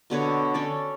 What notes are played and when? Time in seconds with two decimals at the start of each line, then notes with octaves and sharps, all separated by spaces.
0.10 B2 D3 B4 C#5
0.54 C#4 A4 D5